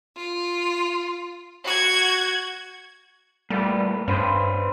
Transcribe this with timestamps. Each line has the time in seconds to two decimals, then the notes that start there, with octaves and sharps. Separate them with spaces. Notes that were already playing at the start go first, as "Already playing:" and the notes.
0.15 F4
1.64 F#4 G#6
3.50 A#2 G3 A3 B3
4.08 G2 C#4 B4 C5